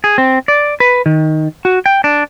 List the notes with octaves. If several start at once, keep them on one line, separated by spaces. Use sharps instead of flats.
G#4
C4
D5
B4
D#3
F#4
G5
D4